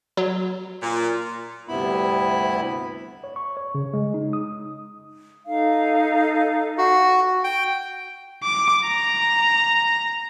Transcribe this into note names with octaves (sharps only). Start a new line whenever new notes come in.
F#3
A#2
D2 G2 C3 B3 E4 B5
C#5
C#6
C#5
C#3
G#3
D#4
D#6
D#4 A4 F5
F#4
G5
D6
A#5